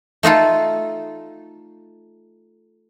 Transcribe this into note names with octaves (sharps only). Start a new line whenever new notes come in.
A3 D#4 F4 A4